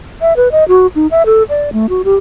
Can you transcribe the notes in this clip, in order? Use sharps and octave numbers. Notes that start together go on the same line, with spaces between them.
E5
B4
D#5
F#4
D#4
E5
A4
D5
A3
F#4
G4